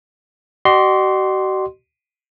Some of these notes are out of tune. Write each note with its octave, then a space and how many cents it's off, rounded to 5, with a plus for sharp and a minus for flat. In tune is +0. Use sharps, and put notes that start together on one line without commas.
F#4 +45 D#5 -45 C6 +0